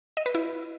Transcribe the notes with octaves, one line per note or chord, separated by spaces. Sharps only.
D#5
B4
E4